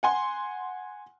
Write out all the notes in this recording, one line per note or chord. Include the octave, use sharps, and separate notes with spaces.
F#5 G#5 C6